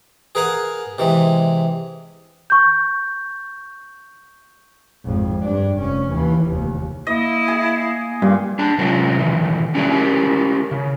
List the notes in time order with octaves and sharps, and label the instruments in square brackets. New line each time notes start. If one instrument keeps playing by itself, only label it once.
[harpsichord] G#4 A#4 B4 F5 F#5 G#5
C3 E3 G#3
[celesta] C#6 G6
[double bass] G#1 F2
G2 D4
F1 C#4
D#2 E3
F1 D#2
[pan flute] A#3 [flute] E4 [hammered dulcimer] D#5
[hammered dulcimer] G#4
[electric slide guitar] G2 [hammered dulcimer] A#2
[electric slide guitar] D4 G#4 A5
C3 F#3 G#3 C#4 F4 A#4
B2 D#3 E3
G3 C#4 D4 E4 F#4 G#4
C#4 E4 G4 A#4
C#3